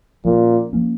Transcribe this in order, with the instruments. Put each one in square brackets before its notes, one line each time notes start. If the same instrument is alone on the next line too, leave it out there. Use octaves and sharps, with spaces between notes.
[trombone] A#2 [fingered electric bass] F3 A#3 C#4
[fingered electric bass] F3 A#3 C#4